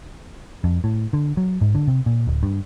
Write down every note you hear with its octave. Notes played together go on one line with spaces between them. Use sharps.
F2
A2
D3
F#3
G#2
D3
C3
A#2
D1
G2